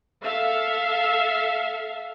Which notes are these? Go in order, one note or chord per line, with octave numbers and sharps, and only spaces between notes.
A4 E5 F5